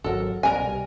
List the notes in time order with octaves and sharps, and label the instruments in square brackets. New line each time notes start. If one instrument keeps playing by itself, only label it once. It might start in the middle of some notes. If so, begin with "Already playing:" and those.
[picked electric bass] G#1 C3 F#3 [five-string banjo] A4 A#4
[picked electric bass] C2 B2 G3 [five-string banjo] A#4 G#5